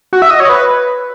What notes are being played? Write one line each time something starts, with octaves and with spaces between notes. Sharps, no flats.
F#4
E5
D#5
C#5
B4